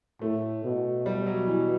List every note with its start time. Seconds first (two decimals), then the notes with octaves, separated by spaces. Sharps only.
0.22 A2 A3
0.64 B2
1.06 G3
1.26 F#3
1.47 E3